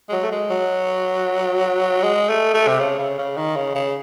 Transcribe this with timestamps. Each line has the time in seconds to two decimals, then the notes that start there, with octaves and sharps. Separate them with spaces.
0.09 G#3
0.12 F#3
0.23 A3
0.32 G#3
0.50 F#3
2.03 G#3
2.29 A3
2.54 A3
2.68 C3
2.79 C#3
2.98 C#3
3.18 C#3
3.37 D#3
3.56 C#3
3.75 C#3